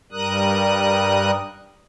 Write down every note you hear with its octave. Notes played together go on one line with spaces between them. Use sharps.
G2 G3 A#4 D#6 F#6